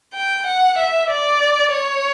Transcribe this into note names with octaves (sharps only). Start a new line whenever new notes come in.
G5
F#5
E5
D5
C#5